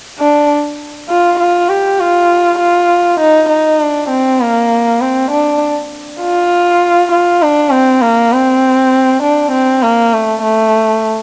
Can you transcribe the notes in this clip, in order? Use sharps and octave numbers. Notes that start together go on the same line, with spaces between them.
D4
F4
F4
G4
F4
F4
D#4
D#4
D4
C4
A#3
C4
D4
F4
F4
D4
C4
A#3
C4
D4
C4
A#3
A3
A3